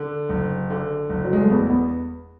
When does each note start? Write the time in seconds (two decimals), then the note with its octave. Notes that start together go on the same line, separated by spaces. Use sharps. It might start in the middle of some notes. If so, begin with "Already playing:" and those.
Already playing: D3
0.29 F#1
0.70 D3
1.09 F#1
1.24 F#3
1.33 G#3
1.41 A3
1.50 E2 B3
1.70 B3